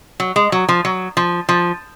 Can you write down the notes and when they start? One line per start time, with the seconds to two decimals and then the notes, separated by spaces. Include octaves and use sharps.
0.20 F#3
0.36 G#3
0.52 F#3
0.69 F3
0.85 F#3
1.17 F3
1.49 F3